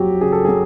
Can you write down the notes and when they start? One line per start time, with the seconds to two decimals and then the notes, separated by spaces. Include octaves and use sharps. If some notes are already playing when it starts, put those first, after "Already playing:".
Already playing: F2 F#3 F#4 G4
0.21 C#3 G#4
0.32 A4
0.45 F#3 G#4